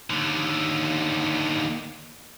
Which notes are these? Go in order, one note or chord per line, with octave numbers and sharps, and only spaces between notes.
D#2 D3